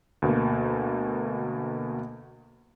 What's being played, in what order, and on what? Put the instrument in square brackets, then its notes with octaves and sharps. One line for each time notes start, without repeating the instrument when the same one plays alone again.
[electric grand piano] D2 B2 A#3